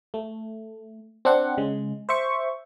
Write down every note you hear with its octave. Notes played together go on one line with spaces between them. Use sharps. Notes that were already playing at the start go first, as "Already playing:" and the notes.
A3
C4 D4 F#5
C#3 G#3
C5 E5 C#6